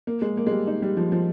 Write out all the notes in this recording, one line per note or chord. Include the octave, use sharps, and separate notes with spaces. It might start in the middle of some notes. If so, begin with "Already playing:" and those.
A#3
G#3
A#3
G#3
G3
D#4
G3
F3
F3